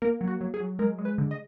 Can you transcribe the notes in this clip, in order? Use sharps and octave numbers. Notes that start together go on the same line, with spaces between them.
A#3 A#4
F#3
F#4
F#3
G#4
F#3
G#3 A#4
G#3
B4
D3
D#5